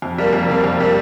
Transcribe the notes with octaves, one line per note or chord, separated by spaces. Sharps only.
F2
C3 G3 A#3
F2
C3 G3 A#3
F2
C3 G3 A#3